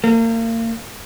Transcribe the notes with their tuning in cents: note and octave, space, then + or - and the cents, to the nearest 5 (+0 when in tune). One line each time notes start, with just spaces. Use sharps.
A#3 -35